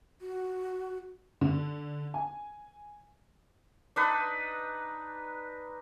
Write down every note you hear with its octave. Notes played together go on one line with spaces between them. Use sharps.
F#4
D3
G#5
D4 D#4 B4